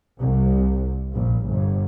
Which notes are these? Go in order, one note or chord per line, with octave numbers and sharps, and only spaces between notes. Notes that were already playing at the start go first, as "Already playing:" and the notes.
C2
A#1
G1